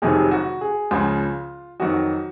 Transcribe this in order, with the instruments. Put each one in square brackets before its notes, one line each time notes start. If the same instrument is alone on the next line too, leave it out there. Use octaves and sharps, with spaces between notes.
[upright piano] F1 F2 C3 D#3 F#3 G#4
F#4
G#4
C#2 C#3 F3 F4
F2 D#3 F#3 F#4